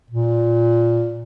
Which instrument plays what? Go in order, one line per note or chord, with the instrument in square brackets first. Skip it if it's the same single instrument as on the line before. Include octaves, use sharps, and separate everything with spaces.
[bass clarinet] A#2